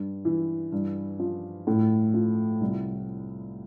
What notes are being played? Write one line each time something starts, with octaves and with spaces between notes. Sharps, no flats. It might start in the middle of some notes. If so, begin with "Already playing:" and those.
Already playing: G2
E3
G2
F3
A2
F3
C2